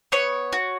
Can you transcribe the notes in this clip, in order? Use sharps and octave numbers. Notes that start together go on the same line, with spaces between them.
B3 C#5
F#4